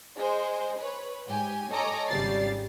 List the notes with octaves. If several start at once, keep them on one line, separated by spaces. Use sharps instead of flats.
G#3 C5
B4 C#5
G#2 G4 G#5
A4 C#5 D#5 G#5 A#5 D6
G#1 C#3 G3 D5 A6 C7